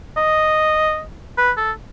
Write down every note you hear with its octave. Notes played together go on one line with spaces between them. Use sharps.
D#5
B4
A4